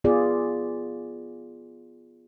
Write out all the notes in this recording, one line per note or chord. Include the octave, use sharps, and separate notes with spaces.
B3 F4 G#4 D5